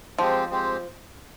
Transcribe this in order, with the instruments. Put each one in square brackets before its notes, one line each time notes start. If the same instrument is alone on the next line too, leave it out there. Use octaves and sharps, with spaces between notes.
[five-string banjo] F3 [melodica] G#3 C4 G4 C5
[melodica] G#3 C4 G4 C5